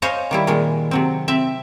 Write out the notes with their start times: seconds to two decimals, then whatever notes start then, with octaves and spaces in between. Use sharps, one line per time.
0.02 C5 C#5 D#5 F5 G#5 A#5
0.31 D#3 G3 E4
0.47 A#2 D#3 G#3
0.91 C3 F#3 C4
1.28 C4 E5